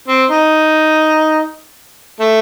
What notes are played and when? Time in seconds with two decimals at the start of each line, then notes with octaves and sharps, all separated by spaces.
0.08 C4
0.30 D#4
2.20 A3